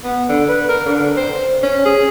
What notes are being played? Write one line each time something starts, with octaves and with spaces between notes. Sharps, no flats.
B3
D3
B4
A#4
D3
C5
C#4
G#4